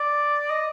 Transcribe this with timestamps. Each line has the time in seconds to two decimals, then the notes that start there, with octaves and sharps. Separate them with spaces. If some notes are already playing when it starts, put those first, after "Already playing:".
Already playing: D5
0.50 D#5